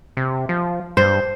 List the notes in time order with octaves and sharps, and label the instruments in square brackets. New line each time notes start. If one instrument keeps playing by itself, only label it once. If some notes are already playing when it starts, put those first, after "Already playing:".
[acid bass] C3
F3
[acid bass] G2 [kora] C5